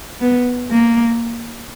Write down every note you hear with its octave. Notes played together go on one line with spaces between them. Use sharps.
B3
A#3